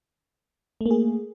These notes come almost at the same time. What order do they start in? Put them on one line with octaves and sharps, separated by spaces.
A3 A#3 G#4